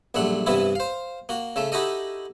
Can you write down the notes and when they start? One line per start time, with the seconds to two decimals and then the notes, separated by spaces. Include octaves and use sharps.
0.14 A#1 F#2 G3 A3 F#5
0.46 G2 C3 E3 B3 E4
0.75 C5 F5
1.29 A#3 F#4
1.56 C#3 A3 E5
1.72 D#4 E4 F#4 G4 A4 D#5